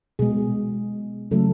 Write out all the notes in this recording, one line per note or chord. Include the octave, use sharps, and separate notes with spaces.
B2 G#3 G#4
C#3 F#3 A3 A4